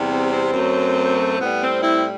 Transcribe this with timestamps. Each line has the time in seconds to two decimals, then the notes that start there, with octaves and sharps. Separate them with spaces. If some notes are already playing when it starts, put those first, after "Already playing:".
Already playing: E2 C3 G3
0.10 C4
0.31 C4
0.53 F#2 F#3 A3
1.39 A2 G3 B3
1.61 C4
1.83 C4 E4